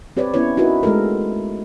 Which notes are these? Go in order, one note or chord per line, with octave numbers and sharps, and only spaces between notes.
C4 G4 B4 C#5 D5
B3 C#4 E4 B4 C#5
D#4 E4 F#4 A#4 B4
G#3 A3 A4 A#4